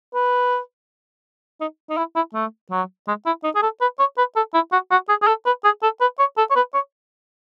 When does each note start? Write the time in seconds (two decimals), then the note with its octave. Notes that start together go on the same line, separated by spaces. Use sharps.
0.14 B4
1.61 D#4
1.90 D#4
1.97 E4
2.16 E4
2.34 A3
2.71 F#3
3.07 G#3
3.26 E4
3.44 D#4
3.55 G#4
3.63 A4
3.81 B4
3.99 C#5
4.18 B4
4.36 A4
4.54 E4
4.72 F#4
4.91 F#4
5.09 G#4
5.22 G#4
5.27 A4
5.46 B4
5.64 G#4
5.83 A4
6.01 B4
6.19 C#5
6.38 A4
6.50 C#5
6.56 B4
6.74 C#5